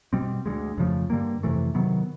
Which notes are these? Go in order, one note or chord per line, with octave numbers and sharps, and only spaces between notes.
B2 G3 C4
D2 D3 F3 G#3
F2 C#3 F3 A3
G2 D3 G3 A#3
F2 C3 E3 A3
C3 D#3 F#3 B3